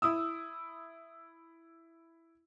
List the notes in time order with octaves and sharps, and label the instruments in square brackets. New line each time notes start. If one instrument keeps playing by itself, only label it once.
[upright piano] E4 D#6 E6